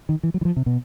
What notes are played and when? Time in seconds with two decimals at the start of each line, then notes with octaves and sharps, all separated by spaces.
0.09 D#3
0.23 E3
0.34 F#3
0.41 E3
0.45 F3
0.56 C3
0.66 B2